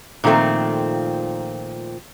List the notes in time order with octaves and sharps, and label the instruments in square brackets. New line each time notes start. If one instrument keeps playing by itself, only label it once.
[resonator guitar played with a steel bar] A#2 D#3 F3 A3 C4